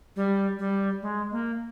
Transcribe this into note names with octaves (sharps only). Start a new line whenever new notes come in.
G3
G3
G#3
A#3